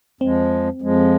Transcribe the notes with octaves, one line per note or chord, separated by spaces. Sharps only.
F2 F3 G#3 C4
F2 F3 G#3